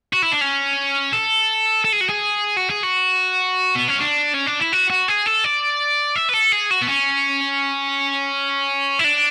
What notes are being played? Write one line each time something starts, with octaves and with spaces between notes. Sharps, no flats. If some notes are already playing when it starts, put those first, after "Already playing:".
F#4
E4
D4
C#4
A4
A4
G#4
F#4
G#4
F#4
G#4
F#4
B3
C#4
D4
C#4
D4
E4
F#4
F#4
G#4
A4
D5
E5
B4
A4
G#4
F#4
B3
C#4
E4
D4